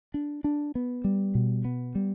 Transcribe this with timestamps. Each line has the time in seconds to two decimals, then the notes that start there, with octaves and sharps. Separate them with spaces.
0.14 D4
0.44 D4
0.75 B3
1.04 G3
1.35 B2
1.65 B3
1.95 G3